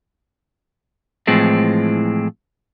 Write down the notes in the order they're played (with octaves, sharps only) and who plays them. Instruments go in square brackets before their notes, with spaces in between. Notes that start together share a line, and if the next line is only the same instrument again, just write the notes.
[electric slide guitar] A2 E3 F3 G#3 C4